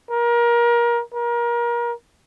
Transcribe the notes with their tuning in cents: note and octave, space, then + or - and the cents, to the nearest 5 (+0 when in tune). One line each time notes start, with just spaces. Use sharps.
A#4 +25
A#4 +30